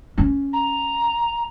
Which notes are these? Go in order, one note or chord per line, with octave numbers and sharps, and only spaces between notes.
C#4
A#5